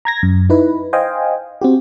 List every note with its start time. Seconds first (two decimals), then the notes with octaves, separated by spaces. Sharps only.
0.05 A#5 G#6 A#6
0.23 F#2
0.50 D#4 E4 B4
0.93 C5 D#5 F5 G5 G#5
1.61 C4 F#4 G4